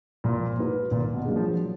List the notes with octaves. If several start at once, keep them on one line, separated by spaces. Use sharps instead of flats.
A#2 F3
A#3 D#4 F#4 B4
A#2 D#3
B2
F#3 A#3 D4 G#4
F3
F#3